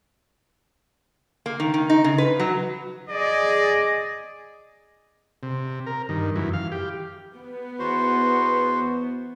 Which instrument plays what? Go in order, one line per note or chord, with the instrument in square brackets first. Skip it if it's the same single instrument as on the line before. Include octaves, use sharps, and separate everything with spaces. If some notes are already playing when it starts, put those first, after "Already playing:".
[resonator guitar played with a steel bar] A#3
D#3
D#3
D#4
C#3
B4
F#3
[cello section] G#4 D#5 [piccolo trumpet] D5
[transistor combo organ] C3
A#4
G2 D#3
F#2 E3
F5
G4
[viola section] B3
[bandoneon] E2 F#4 C5